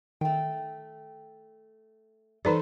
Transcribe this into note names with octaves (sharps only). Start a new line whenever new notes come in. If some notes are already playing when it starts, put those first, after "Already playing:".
D#3 A3 G5
E3 D#4 A4 B4 C5 D5